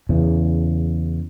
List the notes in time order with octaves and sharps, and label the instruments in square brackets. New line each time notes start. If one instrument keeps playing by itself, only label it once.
[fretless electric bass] E2 C#3